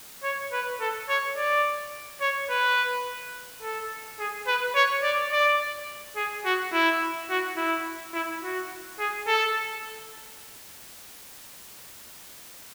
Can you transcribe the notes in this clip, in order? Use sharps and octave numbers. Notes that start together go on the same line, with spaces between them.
C#5
B4
A4
C#5
D5
C#5
B4
A4
G#4
B4
C#5
D5
D5
G#4
F#4
E4
F#4
E4
E4
F#4
G#4
A4